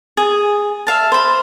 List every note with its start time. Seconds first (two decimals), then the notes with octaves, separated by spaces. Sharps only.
0.17 G#4
0.87 E5 F5 A5
1.12 C5 B5